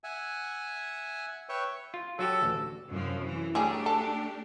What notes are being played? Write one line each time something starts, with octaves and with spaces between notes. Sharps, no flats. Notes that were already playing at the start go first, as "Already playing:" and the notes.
E5 F#5 G#5
B4 C#5 E5 G5 C#6
F4
F#3 F#4 G4 A4
A1 D2
F#2 C3 F3
E3
F#3 G3 A3 D4 G4 G#4
A4